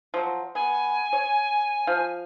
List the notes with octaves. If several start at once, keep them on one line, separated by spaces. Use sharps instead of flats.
F3 F#3
B3 G#5
C#5
F3 F5